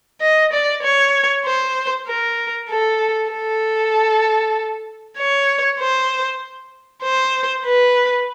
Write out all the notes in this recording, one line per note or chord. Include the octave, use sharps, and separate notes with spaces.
D#5
D5
C#5
C5
A#4
A4
A4
C#5
C5
C5
B4